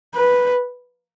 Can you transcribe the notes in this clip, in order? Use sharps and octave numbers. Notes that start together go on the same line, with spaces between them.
B4